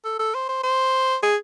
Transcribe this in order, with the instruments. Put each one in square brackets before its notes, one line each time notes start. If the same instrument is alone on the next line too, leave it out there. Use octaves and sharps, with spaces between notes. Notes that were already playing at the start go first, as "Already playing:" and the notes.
[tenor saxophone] A4
A4
C5
C5
C5
G#4